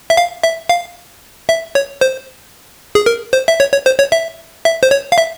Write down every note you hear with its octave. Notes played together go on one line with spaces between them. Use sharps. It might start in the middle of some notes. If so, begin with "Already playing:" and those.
E5
F5
E5
F5
E5
C#5
C5
G#4
A#4
C5
E5
C#5
C#5
C5
C#5
E5
E5
C5
C#5
F5
E5